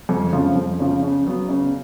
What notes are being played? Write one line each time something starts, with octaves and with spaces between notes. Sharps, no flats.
F2
C#3 F3
F2
C#3 F3
C#3
F#3 B3
C#3